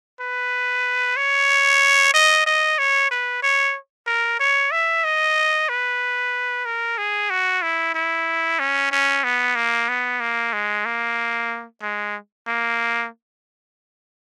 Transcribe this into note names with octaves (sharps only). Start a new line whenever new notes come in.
B4
C#5
D#5
D#5
C#5
B4
C#5
A#4
C#5
E5
D#5
B4
A#4
G#4
F#4
E4
E4
C#4
C#4
B3
A#3
B3
A#3
G#3
A#3
G#3
A#3